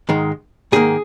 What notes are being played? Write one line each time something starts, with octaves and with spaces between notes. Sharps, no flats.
G#2 D#3 G#3
G#2 D#3 A#3 G#4